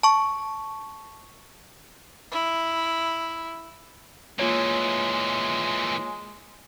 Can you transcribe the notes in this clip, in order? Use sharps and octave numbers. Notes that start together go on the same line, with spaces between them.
A5 C#6
E4
A#2 E3 G#3 A#3 F4 C#5